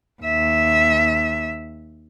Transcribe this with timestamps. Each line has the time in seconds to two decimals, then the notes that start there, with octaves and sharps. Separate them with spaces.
0.22 D#2 E5